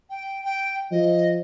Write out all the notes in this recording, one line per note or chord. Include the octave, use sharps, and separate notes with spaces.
G5
G5
F3 D#5